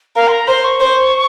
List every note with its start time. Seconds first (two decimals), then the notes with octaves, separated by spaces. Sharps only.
0.16 A#4 F5
0.28 C6
0.32 A#5
0.47 C5 C6
0.64 C#6
0.80 C5